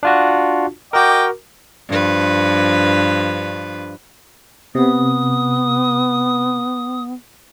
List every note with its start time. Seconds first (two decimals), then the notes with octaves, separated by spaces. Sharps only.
0.03 D4 F4 F#4
0.93 F#4 A#4 D#5 G5 D6
1.89 G2 F3 B4
4.75 C3 B3 D#6